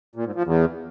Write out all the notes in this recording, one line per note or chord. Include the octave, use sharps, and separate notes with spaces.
A#2
G#2
F3
E2